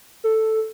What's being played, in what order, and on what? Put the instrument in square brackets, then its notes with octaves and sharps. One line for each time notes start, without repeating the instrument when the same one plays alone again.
[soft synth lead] A4